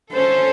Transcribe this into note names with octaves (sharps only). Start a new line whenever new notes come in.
C#4 F4 A4 C5